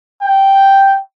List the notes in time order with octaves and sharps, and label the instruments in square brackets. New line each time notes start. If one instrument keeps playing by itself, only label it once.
[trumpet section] G5